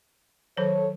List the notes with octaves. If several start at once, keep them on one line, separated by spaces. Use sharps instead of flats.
D#3 F#3 A4 C5 C#5